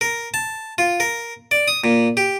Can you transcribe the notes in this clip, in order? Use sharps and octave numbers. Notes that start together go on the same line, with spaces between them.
A#4
A5
F4
A#4
D5
D#6
A#2
G4